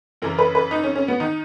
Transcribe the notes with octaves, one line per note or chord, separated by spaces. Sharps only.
F#2 C#3 E3 A#4
B4
B4
D#4
C#4
C#4
B3
D#3 D#4